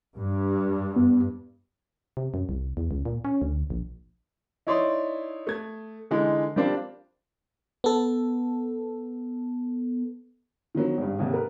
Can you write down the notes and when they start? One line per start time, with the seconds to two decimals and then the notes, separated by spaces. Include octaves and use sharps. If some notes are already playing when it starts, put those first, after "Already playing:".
0.15 G2
0.96 B3
2.17 C3
2.34 F#2
2.49 C2
2.77 E2
2.91 C#2
3.05 A#2
3.25 C#4
3.41 D2
3.70 A#1
4.67 D#4 E4 C#5 D5 C6 D#6
5.47 A3 G#6
6.11 D3 E3 G#3 D#4
6.56 G3 A#3 C4 D4 F4
7.84 B3 A4
10.75 D#3 F3 F#3 B3
10.97 G#1 G2
11.19 G#1 D#2 C3
11.33 A#4 B4